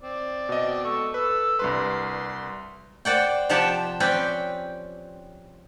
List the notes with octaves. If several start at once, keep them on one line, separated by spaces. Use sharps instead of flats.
C4 D5
B2 D#5
A4 C#6
A4 B4 E6
C2 G2 B4 C6
C5 D5 F#5 G5
C3 F3 G4 F#5 G5 A5
C4 C#4 B4 D5 G5